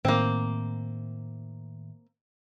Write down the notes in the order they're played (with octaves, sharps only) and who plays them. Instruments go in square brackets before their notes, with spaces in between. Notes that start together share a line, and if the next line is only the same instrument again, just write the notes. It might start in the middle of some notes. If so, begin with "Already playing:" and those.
[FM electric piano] A2 D#3 [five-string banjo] A#3 C4